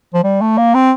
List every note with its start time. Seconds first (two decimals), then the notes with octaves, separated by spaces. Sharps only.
0.14 F3
0.23 G3
0.41 A3
0.57 A#3
0.74 C4